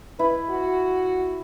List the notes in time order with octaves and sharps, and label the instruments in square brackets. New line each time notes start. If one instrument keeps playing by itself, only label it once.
[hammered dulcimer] E4 [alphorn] B4
[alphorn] F#4